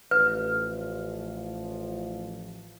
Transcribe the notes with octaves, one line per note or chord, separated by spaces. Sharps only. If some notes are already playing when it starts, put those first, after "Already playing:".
A1 F3 B4